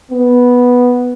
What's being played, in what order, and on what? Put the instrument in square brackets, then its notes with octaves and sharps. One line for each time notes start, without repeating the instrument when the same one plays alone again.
[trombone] B3